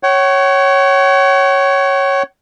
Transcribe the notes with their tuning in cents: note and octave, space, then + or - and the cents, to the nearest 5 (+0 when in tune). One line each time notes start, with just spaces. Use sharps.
C#5 +0 F#5 +45